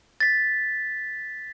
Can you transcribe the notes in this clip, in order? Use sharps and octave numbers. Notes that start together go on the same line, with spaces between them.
A6 B6